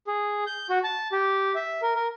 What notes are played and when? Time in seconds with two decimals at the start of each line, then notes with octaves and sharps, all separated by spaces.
0.07 G#4
0.47 G6
0.70 F#4
0.84 A5
1.12 G4
1.55 E5
1.82 A#4
1.95 A#4